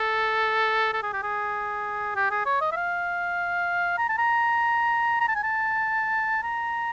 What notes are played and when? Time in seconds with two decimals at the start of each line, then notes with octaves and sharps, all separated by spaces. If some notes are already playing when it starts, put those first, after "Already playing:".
Already playing: A4
0.93 A4
1.03 G#4
1.13 G4
1.23 G#4
2.16 G4
2.31 G#4
2.46 C#5
2.61 D#5
2.72 E5
2.76 F5
3.98 A#5
4.09 A5
4.18 A#5
5.20 A#5
5.28 A5
5.35 G#5
5.43 A5
6.43 A#5